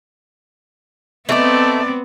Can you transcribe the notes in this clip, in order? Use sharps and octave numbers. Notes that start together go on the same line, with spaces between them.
A3 B3 C4 D#4 D5